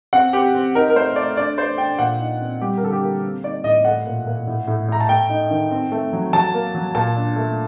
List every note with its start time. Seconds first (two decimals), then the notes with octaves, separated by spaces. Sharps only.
0.13 C4 F#5
0.33 C4 G4
0.55 C4
0.75 D#4 A#4
0.90 A#4
0.95 A3 C5
1.16 A3 D5
1.37 D4 D5
1.58 A3 C5
1.78 D4 G5
1.99 A#2 F#5
2.20 D#4
2.41 C4
2.61 G3 G4
2.77 A#4
2.82 D3 A4
2.93 G4
3.03 A#3
3.24 C4
3.44 D#4 D5
3.64 A2 D#5
3.85 A3 F#5
4.06 A#2
4.27 A#2
4.47 A2
4.67 A2
4.88 A2 A#5
5.00 A5
5.09 A3 G5
5.29 D#4
5.50 D#3
5.71 C4
5.92 A3
6.13 F#3
6.33 F#3 A5
6.54 A#3
6.75 F#3
6.95 A#2 A5
7.16 D4
7.36 A3